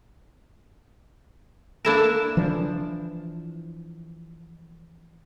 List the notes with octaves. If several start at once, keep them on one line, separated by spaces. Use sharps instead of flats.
A#3 D4 E4 A4 A#4 E7
E3 F3 D4